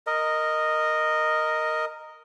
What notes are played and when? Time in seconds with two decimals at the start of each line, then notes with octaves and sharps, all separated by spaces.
0.07 A#4 D#5